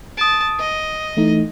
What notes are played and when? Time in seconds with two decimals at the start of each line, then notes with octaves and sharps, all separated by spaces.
0.18 A5 D#6 D7
0.59 D#5
1.17 E3 A3 D#4